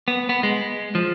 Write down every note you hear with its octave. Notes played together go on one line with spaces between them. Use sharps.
B3
B3
G#3
F3